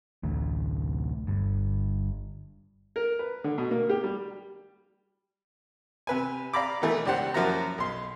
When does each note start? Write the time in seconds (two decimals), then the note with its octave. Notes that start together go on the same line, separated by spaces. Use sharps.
0.23 A1 D2 A3
1.27 G1 G2
2.96 A#4
3.19 B4
3.44 D3
3.58 B2
3.71 A#3
3.90 G4
4.04 G3
6.07 C3 B4 G#5
6.53 D5 F5 A#5 B5 D6
6.82 B2 D#3 E3 A3
7.05 C#2 D4 G4 C5 F#5
7.34 F#2 F3 A#3 E4 F#4 A#5
7.78 B1 C6